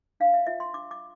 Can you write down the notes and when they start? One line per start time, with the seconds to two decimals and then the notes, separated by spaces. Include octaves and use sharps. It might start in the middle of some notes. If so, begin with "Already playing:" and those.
0.20 D4 F5
0.34 E5
0.46 F4 C5 E5
0.60 C6
0.73 D4 D6
0.91 D6